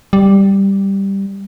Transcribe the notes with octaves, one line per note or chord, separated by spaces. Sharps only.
G3